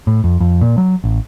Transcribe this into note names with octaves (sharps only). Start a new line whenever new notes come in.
A2
F2
F2
A#2
F#3
A1